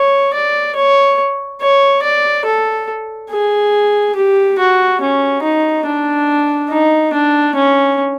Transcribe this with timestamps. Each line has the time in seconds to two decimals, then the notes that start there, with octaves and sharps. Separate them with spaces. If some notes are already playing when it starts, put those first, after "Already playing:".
Already playing: C#5
0.34 D5
0.75 C#5
1.62 C#5
2.03 D5
2.45 A4
3.30 G#4
4.16 G4
4.59 F#4
5.01 C#4
5.42 D#4
5.86 D4
6.70 D#4
7.13 D4
7.55 C#4